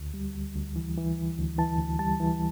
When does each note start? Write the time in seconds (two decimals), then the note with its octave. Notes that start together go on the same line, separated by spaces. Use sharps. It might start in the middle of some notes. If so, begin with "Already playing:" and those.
Already playing: D2
0.14 G3
0.35 D2
0.56 D2
0.76 E3
0.97 E3
1.18 E3
1.38 D2
1.58 E3 A5
1.79 D2
1.99 G3 A5
2.20 E3